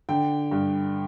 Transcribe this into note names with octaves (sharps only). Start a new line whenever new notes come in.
D3 G5
G2